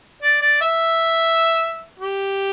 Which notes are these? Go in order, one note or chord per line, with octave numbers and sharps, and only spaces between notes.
D5
D5
E5
G4